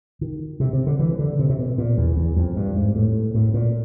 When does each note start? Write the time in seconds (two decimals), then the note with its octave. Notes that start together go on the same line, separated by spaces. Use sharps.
0.21 D#3
0.60 C3
0.73 C3
0.87 D3
0.99 E3
1.19 D3
1.39 C3
1.49 C3
1.59 B2
1.78 A#2
1.98 E2
2.16 E2
2.36 F2
2.56 G2
2.76 G#2
2.96 A2
3.34 A2
3.54 A#2